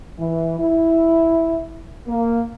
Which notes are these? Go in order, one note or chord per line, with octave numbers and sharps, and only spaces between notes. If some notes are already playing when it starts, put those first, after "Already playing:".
E3
E4
A#3